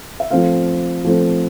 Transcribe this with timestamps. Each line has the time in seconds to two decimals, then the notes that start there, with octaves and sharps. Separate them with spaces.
0.20 E5
0.31 F3 A3 C4 F5
1.05 F3 A3 C4